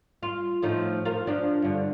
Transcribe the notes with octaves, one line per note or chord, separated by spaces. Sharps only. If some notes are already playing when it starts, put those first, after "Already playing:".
F4
A2 F3 D#4
F4 A#4
F3 D4
G2 D3